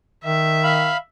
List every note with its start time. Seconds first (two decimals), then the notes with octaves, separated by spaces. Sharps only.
0.24 D#3 E5
0.63 F5 B5